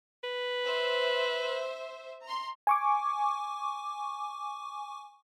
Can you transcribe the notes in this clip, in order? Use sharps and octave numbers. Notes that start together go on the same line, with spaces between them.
B4
C5 E5
A#5 C6
G#5 C#6 D6